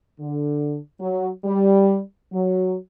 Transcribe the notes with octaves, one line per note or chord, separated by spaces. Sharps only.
D3
F#3
G3
F#3